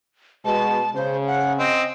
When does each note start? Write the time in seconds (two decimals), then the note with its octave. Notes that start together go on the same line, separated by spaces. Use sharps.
0.45 B2 G#3 A5
0.95 C#3 C5
1.27 F#5
1.59 C4 D#5